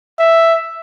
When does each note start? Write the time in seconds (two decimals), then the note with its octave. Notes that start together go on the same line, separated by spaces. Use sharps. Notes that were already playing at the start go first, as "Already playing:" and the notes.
0.19 E5